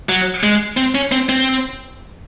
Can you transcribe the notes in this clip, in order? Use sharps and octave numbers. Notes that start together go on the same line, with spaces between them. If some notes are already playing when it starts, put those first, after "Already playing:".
F#3
G#3
C4
C#4
C4
C4